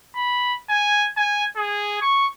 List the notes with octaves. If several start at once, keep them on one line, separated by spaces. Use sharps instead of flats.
B5
G#5
G#5
G#4
C#6